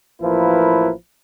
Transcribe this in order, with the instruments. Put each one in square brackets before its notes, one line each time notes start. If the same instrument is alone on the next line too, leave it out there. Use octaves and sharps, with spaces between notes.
[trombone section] A1 F3 A#3 E4 A#4 B4